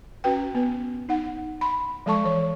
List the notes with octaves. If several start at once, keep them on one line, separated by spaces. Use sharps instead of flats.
C#4 F#4 B4 G5
B3 B4
D#4 F#5
B5 C6
F3 G#3 A4 A5 C#6
E3 C#5